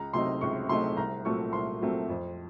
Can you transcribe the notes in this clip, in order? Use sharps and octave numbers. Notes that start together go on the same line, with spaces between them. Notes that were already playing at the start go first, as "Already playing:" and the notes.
Already playing: C#2 A#5
C3 F#3 A3 D#4 C6
C#2 C#6
C3 F#3 A3 D#4 C6
C2 A#5
A#2 F#3 A3 C4 C#6
C2 C6
A#2 F#3 A3 C4
F2